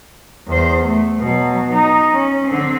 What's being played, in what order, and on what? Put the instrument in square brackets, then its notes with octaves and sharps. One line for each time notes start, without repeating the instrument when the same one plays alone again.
[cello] E2 C5
A3
B2 F#3
D#4
C#4
D3 C4